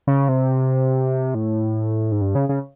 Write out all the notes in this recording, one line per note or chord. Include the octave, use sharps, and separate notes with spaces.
C#3
C3
A2
G#2
G2
C#3
C#3